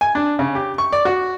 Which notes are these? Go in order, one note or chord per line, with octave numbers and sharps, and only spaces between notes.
G#5
D4
C#3
G4
C#6
D5
F#4